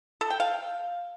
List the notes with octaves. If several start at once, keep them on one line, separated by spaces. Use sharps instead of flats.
A4
G5
F5